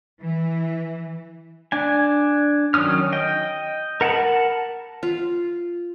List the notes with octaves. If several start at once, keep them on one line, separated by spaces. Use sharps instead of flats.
E3
D4 G#5
D#3 F#3 C#4 D#6 F6
D#5 G5
A#4 F#5 G#5 A5 B5
F4